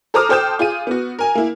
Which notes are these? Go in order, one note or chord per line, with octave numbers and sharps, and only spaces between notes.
A4 C5 A#5 D6 D#6 F6
A4 C5 G5 D6 G6 E7
F4 G#4 D#7
B3 F#4
A#4 G#5
A#3 E4